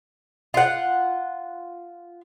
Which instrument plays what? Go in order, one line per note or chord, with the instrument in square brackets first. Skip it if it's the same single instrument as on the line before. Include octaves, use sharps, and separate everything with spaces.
[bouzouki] F4 F#5